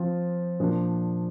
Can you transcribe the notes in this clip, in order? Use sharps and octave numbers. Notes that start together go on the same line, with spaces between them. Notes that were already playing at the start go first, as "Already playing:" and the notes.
Already playing: F3 C4 F4
A#2 F3 D4